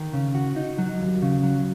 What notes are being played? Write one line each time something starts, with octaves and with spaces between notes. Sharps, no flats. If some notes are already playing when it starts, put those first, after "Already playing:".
Already playing: D#3
C#3
F#4
D#4
F#3
D#2
C#3
F#3